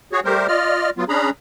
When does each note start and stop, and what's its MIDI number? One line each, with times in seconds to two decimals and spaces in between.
0.12 0.20 66
0.12 0.20 68
0.12 0.20 73
0.25 0.47 55
0.25 0.47 57
0.25 0.47 67
0.25 0.47 70
0.25 0.47 72
0.48 0.90 65
0.48 0.90 74
0.48 0.90 75
0.48 0.90 89
0.97 1.04 54
0.97 1.04 59
0.97 1.04 65
1.09 1.30 61
1.09 1.30 62
1.09 1.30 68
1.09 1.30 82
1.09 1.30 83